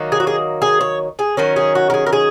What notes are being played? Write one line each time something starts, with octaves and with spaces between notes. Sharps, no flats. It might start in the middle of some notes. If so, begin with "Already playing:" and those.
Already playing: D#3 F#3 A#3 D#4
G#4
F#4
G#4
G#4
C#5
G#4
D#3 F#3 C#4 A#4
G#4
F#4
A#4
G#4
A#4
G#4